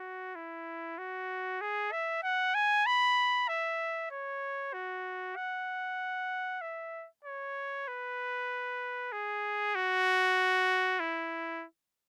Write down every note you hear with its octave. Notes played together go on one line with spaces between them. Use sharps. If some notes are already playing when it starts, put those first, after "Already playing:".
Already playing: F#4
E4
F#4
G#4
E5
F#5
G#5
B5
E5
C#5
F#4
F#5
E5
C#5
B4
G#4
F#4
E4